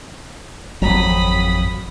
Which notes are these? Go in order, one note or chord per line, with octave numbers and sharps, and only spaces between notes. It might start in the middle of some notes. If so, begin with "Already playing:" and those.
G#1 F2 F#3 B5 D#6